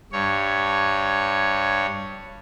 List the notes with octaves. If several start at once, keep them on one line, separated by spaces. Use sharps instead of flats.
G2 C#5